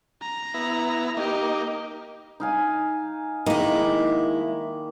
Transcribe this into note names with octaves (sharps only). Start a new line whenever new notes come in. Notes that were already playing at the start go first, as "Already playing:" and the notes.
A#5
B3 E4
A#3 D#4 G4
D#4 F5 G#5
D#3 G#3 A#3 D#4 E4